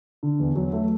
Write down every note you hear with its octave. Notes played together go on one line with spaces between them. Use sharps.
D3
E2
F#3
A3